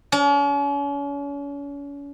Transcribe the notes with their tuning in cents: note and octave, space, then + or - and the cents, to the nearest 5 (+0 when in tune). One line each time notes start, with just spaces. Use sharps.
C#4 +40